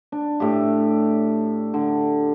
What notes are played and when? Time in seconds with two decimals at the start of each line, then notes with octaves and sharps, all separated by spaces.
0.12 D4
0.40 A2 G4
1.74 D3